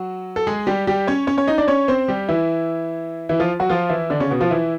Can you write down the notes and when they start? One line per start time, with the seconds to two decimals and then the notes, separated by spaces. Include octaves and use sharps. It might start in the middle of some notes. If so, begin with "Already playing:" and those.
Already playing: F#3 F#4
0.36 A4
0.47 G#3 G#4
0.67 G3 G4
0.87 G3 G4
1.07 C#4 C#5
1.27 C#4 C#5
1.38 C#4 C#5
1.48 D#4 D#5
1.58 D4 D5
1.68 C#4 C#5
1.88 C4 C5
2.08 G3 G4
2.29 E3 E4
3.29 E3 E4
3.40 F3 F4
3.60 F#3 F#4
3.69 F3 F4
3.89 E3 E4
4.10 D3 D4
4.20 C#3 C#4
4.31 B2 B3
4.41 F3 F4
4.51 E3 E4